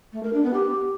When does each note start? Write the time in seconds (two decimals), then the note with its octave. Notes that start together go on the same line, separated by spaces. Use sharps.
0.13 A3
0.23 A#4
0.33 D4
0.44 B3
0.54 G4